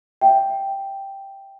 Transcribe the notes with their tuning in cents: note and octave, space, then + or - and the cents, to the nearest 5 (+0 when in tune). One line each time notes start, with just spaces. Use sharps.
E5 +0 G5 +0